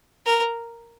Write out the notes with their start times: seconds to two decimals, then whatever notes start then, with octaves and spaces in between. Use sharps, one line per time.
0.26 A#4